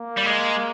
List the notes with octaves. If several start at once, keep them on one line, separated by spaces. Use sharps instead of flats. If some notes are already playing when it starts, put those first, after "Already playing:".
Already playing: A#3
G3
G#3